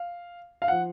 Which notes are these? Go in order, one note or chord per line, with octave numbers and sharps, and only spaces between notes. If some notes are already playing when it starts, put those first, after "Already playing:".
Already playing: F5
F5
F3 F#5